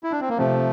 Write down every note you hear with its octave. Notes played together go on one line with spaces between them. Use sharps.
E4
D4
C4
A#3
C3 F3 A3